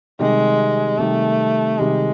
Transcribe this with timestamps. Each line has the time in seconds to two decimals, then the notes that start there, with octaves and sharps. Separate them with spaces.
0.19 C3 D#3 G3 G#3
0.98 C3 D#3 G3 A3
1.78 C3 D#3 G3 G#3